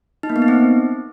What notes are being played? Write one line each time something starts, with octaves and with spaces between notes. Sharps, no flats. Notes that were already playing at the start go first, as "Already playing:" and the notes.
D#4
A#3
B3
D#4
C4